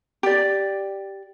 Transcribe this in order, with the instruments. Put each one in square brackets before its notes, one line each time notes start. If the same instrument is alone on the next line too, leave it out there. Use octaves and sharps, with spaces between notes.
[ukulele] G4 D5